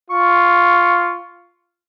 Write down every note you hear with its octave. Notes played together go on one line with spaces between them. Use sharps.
F4 C#6